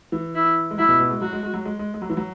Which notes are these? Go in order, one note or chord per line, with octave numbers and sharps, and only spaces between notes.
E3
E4
G#3
F#3 E4
B2
B2
G#3
F#3 F#4
G#3
G#3
F#3
G#3
G#3
G#3
F#3
E3
F#3